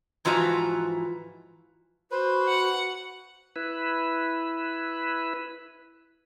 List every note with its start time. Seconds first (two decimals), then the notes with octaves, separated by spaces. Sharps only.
0.25 G#2 E3 F3 F4 F#4 A#5
2.11 F#4 B4 C5
2.48 F#5
3.56 E4 B4